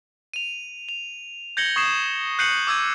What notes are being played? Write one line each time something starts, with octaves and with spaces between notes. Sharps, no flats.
D#7 F7
F7
G6 G#6 A#6 C#7 F#7 G7
C#6 D#6 G#6 C7 E7
F#6 G6 C7 C#7 D#7 F#7
D6 E6 G6 G#6 D#7